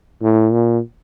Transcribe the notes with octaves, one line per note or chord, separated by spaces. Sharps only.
A2
A#2